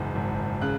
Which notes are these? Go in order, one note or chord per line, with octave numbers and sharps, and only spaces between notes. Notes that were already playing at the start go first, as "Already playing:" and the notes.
Already playing: F#1 E2 G#2
G#1
C#3 F#6